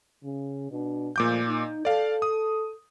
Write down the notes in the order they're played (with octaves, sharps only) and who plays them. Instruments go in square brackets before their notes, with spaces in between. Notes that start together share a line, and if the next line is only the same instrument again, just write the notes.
[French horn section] C#3
B2 D4
[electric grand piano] A#2 D6 G6 [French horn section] F3 G#3 A3
[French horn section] D#4
[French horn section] A4 [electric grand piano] D5 F5
[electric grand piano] D#6